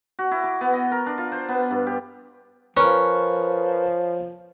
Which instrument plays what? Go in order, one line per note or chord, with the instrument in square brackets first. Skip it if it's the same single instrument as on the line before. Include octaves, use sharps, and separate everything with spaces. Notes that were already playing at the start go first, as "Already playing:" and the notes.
[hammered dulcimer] F#4
E4
D6
B3
D#5
A#4
D4
F4
C5
B3
G2
G4
[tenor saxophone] F3 [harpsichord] C#4 [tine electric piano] A#4 B4